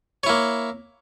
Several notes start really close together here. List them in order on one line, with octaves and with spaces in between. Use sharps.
C#5 E4 A#3